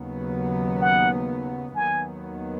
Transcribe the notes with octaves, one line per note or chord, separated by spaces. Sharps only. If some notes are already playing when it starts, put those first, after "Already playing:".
Already playing: D#2 C#3 F#3 B3
F#5
D#2 D#3 F#3 B3 G#5